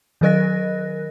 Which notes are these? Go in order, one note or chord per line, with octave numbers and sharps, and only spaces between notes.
D#3 F#3 A#4 D#5 F#6 A#6